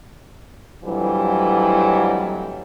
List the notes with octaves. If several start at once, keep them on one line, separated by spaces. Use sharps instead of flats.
F2 A2 D3 E3 F#3 G3